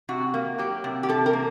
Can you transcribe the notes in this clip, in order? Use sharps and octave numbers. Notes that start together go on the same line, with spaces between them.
C3 F#4
A#3
F#3 G4
C3
G4
C3 A4
A#4
A#3